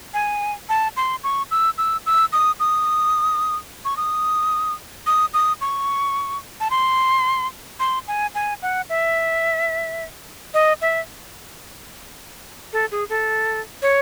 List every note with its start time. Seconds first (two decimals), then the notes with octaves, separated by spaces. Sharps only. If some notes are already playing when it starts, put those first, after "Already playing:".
0.14 G#5
0.69 A5
0.97 C6
1.24 C#6
1.51 E6
1.78 E6
2.06 E6
2.33 D#6
2.60 D#6
3.85 C#6
3.97 D#6
5.07 D#6
5.34 D#6
5.61 C#6
6.60 A5
6.71 C6
7.80 C6
8.08 G#5
8.35 G#5
8.62 F#5
8.89 E5
10.54 D#5
10.81 E5
12.73 A4
12.91 G#4
13.09 A4
13.82 C#5